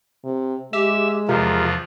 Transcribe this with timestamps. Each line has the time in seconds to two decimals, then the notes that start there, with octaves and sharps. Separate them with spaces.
0.24 C3
0.73 G#3 G4 E5 E6
1.29 E2 C3 F3 F4 A#4